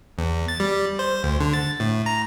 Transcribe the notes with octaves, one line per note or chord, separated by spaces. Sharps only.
E2
A6
G3
C5
D2
D3
A6
A2
A#5